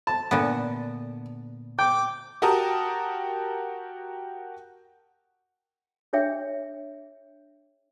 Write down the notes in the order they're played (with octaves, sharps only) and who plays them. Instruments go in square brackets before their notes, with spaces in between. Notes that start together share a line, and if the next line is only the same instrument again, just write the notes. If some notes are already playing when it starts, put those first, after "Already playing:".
[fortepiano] A5
[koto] A#2 D3 B3
[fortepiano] G5 [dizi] D6
[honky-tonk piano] F#4 G4 A#4 A5 D#6
[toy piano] D4 G#4 C#5 E5 G5